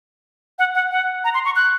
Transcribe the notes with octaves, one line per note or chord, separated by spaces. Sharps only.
F#5
F#5
F#5
A#5
C6
C#6
F#6